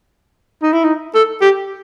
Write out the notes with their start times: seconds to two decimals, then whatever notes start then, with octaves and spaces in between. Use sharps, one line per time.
0.63 D#4
0.73 E4
0.84 D#4
1.15 A4
1.41 G4